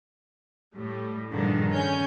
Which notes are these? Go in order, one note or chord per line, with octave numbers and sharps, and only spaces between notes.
A2 G3 A3
G2 A#2 D3 D#3 F3 G#3
C#3 C#4 C#5 G#5 G6